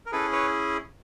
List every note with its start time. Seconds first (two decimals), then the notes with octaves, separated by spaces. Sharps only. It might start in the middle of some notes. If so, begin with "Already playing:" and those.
0.06 A#4
0.12 C#4 E4 G#4 A4 B4
0.32 B4 C#5